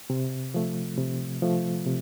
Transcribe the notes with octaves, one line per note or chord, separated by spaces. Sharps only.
C3
F3 A3
C3
F3 A3
C3